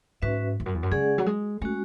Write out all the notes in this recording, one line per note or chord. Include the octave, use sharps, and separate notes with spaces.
G#2 C#4 F#4 B4 E5
E2
F#2
E2
F#2
C#3 G#3 C#4 G#4 D5 F#5
F#3
G#3
G#3 A3 C#4 F#4